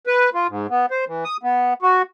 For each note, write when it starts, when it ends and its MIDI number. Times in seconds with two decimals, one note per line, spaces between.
0.07 0.30 71
0.34 0.47 65
0.49 0.67 44
0.70 0.86 59
0.91 1.05 72
1.07 1.24 52
1.24 1.37 87
1.43 1.74 59
1.82 2.02 66